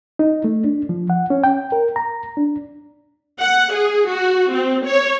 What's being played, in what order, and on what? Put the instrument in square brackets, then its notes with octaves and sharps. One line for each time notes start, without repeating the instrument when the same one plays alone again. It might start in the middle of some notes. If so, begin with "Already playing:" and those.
[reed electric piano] D#4
A3
D4
F3
F#5
C#4
G5
A#4
A#5
D4
[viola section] F#5
G#4
F#4
C4
C#5